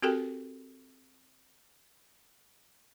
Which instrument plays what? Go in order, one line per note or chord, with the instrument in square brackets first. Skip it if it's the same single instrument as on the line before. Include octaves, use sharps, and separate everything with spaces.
[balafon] C4 F#4 G4 A4 A#4 G5